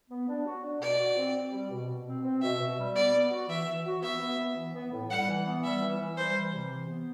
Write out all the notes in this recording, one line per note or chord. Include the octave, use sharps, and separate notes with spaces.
B3
D4
F#4
D4
B2 D5
F#4
C4
C4
G3
B2
B2
C4
C4
B2 E5
B2
G3
B3 D5
B3
F#4
E3 E5
E3
F#4
B3 E5
B3
B3
E3
B3
A2
G3 F#5
E3
B3
G3 E5
E3
E3
G3 C5
E3
C3
E3
B3